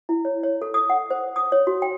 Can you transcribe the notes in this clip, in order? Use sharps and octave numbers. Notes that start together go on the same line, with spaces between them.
E4
C#5
C#5
A4
D#6
F#5
C5
D#6
C#5
F#4
G5